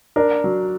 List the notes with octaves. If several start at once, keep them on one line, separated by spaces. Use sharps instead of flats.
D4 A#4
F#3